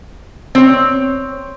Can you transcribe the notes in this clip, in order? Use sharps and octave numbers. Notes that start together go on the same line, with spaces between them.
C4 C#5